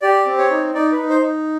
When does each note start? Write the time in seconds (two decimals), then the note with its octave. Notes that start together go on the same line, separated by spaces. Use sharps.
0.02 G4 D5
0.26 C4
0.38 C#5
0.51 D#4
0.74 D#4 D5
0.92 B4
0.97 D#4
1.10 C5
1.22 D#4